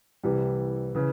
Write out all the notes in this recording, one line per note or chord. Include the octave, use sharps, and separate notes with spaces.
C2 C3 E3 G3
C#3 E3